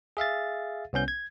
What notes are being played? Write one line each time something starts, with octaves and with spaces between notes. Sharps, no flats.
G#4 E5 F5 A6
C2 B3 C#4 G6
G#6